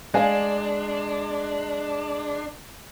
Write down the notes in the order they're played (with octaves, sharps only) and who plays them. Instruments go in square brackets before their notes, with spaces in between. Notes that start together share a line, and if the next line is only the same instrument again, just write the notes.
[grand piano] G#3 [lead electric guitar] D4 [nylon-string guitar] D5 F5 G#5